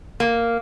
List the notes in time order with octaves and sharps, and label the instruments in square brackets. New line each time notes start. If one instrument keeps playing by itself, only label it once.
[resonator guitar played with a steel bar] A#3